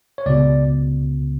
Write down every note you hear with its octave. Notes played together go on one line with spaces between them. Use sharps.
C#5
C#2 B2 D5